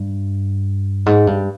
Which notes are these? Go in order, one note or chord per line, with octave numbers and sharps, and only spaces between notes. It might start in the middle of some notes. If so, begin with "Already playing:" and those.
Already playing: G2
G#2
G2